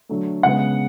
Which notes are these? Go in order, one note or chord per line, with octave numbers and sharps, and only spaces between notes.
D3 F#3 A3
C#3 G#3 B3 F#5